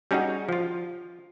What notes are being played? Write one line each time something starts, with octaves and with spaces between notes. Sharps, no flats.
G3 C#4 D#4 F#4 G#4
F3 F4